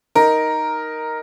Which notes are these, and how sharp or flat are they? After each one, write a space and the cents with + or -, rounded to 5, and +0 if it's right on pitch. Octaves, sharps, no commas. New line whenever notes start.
D#4 +5 A#4 +0